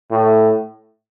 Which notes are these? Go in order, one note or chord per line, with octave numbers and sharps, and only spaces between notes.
A2